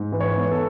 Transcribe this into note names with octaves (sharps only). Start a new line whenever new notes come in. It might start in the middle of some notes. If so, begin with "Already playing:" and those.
Already playing: G#2
E3
C#5
B3
A4